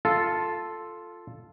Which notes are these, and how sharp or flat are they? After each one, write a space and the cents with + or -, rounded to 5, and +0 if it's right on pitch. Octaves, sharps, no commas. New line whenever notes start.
F4 +0 A4 +0